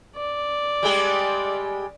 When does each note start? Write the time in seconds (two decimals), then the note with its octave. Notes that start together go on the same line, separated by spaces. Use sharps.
0.17 D5
0.83 G3 G#3 G4